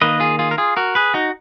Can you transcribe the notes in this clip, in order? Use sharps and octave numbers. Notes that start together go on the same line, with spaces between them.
D#3 A#3 B4 D#5
F4 G#4
F4 G#4
A#4
F4 G#4
F#4 A#4
G#4 B4
D#4 F#4